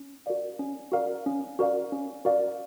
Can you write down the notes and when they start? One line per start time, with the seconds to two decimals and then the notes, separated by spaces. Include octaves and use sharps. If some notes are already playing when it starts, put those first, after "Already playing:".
Already playing: C#4
0.26 F#4 A#4 D5 F5
0.59 C#4
0.92 F#4 A#4 D5 F5
1.26 C#4
1.59 F#4 A#4 D5 F5
1.92 C#4
2.25 F#4 A#4 D5 F5